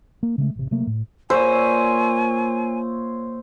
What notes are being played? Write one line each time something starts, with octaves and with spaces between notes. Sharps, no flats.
A#3
C#3 G#3 A3
A1 C3
C3 F#3 A3 A#3
A2
A#2 C5 C#5 E5 G#5